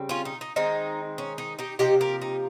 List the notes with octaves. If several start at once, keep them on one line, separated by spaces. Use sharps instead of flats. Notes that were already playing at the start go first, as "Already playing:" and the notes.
Already playing: C#3 G3 C4
C#4 F4
D#4
D#4
D#3 G#3 C4 D#4
C#4
D#4
D#4 G4
C3 F3 A#3 D#4 G4
G4 A#4
D#4